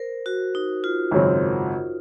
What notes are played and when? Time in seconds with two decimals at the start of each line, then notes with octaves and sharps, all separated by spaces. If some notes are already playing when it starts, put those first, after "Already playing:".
Already playing: A#4 C5
0.26 F#4
0.55 D#4
0.84 F4
1.11 G#1 F#2 C#3 F#3 C4